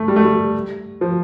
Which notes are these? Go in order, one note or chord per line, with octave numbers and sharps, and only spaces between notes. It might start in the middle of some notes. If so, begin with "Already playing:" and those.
Already playing: A3
G3
A3
G3
F3